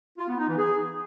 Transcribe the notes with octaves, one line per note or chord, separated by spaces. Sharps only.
F4
B3
D#4
E3
G#4